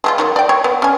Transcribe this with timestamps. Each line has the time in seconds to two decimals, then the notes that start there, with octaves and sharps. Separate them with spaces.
0.04 G#3 C4 F4
0.18 D#3 F#3
0.36 D5 G5
0.49 C#5
0.64 B3
0.82 C#4 G#5